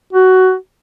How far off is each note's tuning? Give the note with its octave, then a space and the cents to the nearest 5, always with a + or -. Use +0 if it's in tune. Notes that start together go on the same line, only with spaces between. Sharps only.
F#4 +15